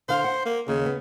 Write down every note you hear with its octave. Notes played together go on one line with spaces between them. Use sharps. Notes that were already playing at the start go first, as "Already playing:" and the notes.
D3 C5 F5
F#5
A#3
D#2 C#3
B3